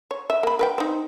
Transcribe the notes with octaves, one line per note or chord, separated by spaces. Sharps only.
C#5
E5
A#3 B5
A#4 B4 G5
C4 D#4